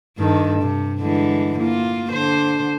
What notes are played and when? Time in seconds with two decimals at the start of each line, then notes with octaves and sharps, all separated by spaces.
0.17 G2 D#3 A4
0.62 C3
1.01 D3 E3 G#3
1.59 A#3 F4
2.11 D3 C5